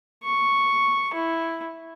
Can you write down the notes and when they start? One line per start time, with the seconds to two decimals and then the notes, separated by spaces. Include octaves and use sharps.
0.24 C#6
1.14 E4